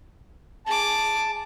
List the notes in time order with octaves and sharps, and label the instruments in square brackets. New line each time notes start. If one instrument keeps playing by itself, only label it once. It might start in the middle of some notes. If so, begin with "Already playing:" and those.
[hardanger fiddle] G#4 D6 [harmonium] A5